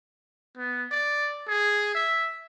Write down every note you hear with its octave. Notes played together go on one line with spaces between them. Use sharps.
B3
D5
G#4
E5